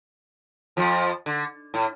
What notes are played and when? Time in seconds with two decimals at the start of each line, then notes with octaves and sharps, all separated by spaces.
0.77 F2 F3
1.26 D3
1.74 A2